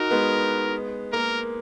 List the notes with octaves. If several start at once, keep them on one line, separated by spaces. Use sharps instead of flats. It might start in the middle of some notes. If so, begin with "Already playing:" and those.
Already playing: D#4 F#4 A#4
G#3 B3
A#3 A#4